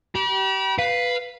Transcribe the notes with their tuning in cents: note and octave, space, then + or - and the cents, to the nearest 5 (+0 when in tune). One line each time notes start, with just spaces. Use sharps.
G4 -30 B5 -40
B4 +0 F5 +0